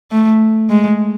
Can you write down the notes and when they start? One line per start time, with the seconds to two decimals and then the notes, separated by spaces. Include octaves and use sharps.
0.11 A3
0.70 G#3